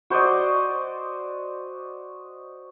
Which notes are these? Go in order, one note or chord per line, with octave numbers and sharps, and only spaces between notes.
F#4 C5 D5 D#5